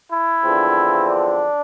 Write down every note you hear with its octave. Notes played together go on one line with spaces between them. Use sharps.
E4
E2 D3 F3 C4
D4